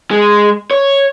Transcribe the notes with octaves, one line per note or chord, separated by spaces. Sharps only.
G#3
C#5